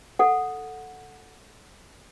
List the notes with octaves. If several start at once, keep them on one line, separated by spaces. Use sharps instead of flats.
A4 F#5